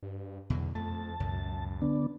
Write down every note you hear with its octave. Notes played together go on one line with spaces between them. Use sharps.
G2
E2 B2 D3 F#3
F2 A3 A5
C#2 F#2 B2
D3 B3 D4